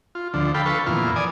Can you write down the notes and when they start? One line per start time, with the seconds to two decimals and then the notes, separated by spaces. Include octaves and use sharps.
0.15 F4
0.34 D2 D3 F3
0.54 A4 F5 G5 B5
0.66 A4 B4 F5 C#6
0.86 F2 A#2 E3 B3 F6
1.16 D5 G#5 D#6